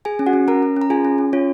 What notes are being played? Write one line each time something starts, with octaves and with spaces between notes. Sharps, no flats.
G#4 G#5
C#4
F#4 F#5
C#4
C#4 A#4 A#5
C#4
C#4
A#5
F4 G#4 G#5
C#4
C#4
C#4 F4 C#5